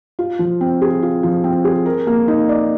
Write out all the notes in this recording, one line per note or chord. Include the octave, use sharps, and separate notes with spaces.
F4
F3
C4
G#4
F4
F3
C4
G#4
A#4
A#3
D#4
D5